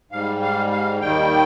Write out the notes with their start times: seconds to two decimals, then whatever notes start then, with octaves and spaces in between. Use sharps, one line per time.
0.11 G#2 G3 F5
0.42 F5
0.71 F5
1.01 D#2 D#3 G3 G5